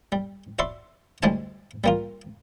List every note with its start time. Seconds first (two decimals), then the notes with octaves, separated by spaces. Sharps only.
0.12 G3
0.59 F#4 D5 E5 B5 C6
1.23 D2 G3 G#3 D4 G#5 A5
1.84 G3 A#3 F4